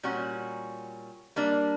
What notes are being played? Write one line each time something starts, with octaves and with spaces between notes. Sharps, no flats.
A#2 G3 C#4 F#4
G3 A#3 D4